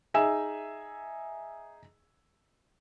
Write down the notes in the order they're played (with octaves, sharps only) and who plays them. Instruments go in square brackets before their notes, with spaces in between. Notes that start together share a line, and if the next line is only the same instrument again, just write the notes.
[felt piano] D#4 G#4 E5 G#5 E6 E7